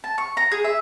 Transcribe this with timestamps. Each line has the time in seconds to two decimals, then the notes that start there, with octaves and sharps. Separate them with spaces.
0.04 A5
0.18 C#6
0.37 A#5
0.52 G#4
0.64 E5